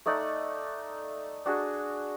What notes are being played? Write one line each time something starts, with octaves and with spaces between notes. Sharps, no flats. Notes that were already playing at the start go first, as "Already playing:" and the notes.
A3 D#4 D5 F#5
D4 F#4 G#4